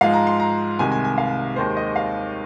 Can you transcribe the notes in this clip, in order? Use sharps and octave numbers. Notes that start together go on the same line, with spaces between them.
G#2 F3 G#3 F5
A#5
C6
A#5
C2 C3 D#3 G#3 G#5
G#5
G#5
F5
D#2 D#3 G#3 C5
D#5
F5